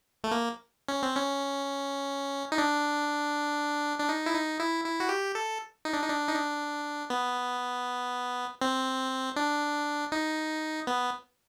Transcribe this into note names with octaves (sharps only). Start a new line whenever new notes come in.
A3
A#3
C#4
C4
C#4
D#4
D4
D4
D#4
E4
D#4
E4
E4
F#4
G4
A4
D#4
D4
D#4
D4
D#4
D4
B3
C4
D4
D#4
B3